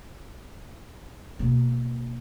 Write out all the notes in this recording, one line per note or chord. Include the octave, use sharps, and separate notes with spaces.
B2 A#3